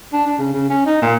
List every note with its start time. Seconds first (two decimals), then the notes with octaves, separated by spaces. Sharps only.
0.13 D4
0.27 D4
0.39 C#3
0.53 C#3
0.70 C#4
0.86 D#4
1.02 A#2